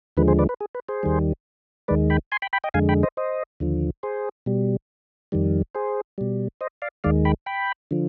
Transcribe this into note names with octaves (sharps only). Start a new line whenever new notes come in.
D#2 D3 F3 G#3 B4
G#4 C5
B4 D5
B4
G#4
B4
G#4 C5
D#2 D#3 G3
D#2 D#3 G#3 B4 D5
G5 B5
G#5 C6
G5 B5
G5 B5
D#5 G5
F2 D3 G#3 F5 G#5
G5 B5
C5 D#5
C5 D#5
D#2 D3 F3
G#4 C5
B2 G3
F2 D#3 G3
G#4 C5
B2 G3
C5 D#5
D5 F5
D#2 D#3 G#3 D5 F5
G5 B5
G5 B5
D3 F3